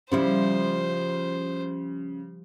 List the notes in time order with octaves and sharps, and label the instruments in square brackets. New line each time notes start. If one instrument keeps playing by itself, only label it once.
[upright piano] C#3 [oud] F3 G3 E4 [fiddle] C5